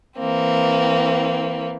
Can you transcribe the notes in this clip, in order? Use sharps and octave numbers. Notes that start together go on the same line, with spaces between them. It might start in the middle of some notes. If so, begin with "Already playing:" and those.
E3 A#3 C4